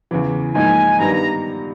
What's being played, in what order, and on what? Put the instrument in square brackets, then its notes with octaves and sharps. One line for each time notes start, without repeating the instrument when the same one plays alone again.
[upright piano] E2 C#3 E3
[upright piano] G#2 F3 A#3 D#4 [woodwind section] G#5
[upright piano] G2 D#3 G3 B3 D4 [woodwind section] A#5
[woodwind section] A#5